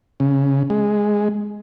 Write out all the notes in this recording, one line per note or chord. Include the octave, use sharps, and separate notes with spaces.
C#3
G#3